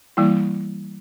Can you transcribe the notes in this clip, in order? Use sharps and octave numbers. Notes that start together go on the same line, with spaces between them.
E3 G3 A#3 E4